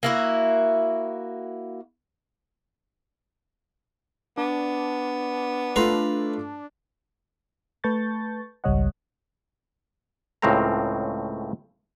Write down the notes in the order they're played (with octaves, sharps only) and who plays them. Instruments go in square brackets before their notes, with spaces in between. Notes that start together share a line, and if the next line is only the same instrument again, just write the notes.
[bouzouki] A#3 E4 F#4
[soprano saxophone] B3 [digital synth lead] D4
[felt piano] A3 F4 [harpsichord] B4 A#5 C6
[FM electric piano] A3 B4 A5 C#6 G6 A6
G#1 C#2 G3 C#5 D#5 F#5
[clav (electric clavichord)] C#2 A2 C#3 C4 A#4 A#5